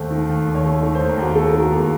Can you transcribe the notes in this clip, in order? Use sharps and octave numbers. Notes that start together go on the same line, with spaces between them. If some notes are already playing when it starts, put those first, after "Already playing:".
Already playing: D#2 A3 C5
D#3
D#2
D#2
C#5
A3
D#3 C#5
C5
D#2
A#4
D#2 F#4
A3 A4
A#4
D#3
F#4
D#2 A#3